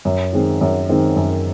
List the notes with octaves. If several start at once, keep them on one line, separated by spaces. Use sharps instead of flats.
F#2
D#3 G#3 C4
F#2
D#3 G#3 C4
F#2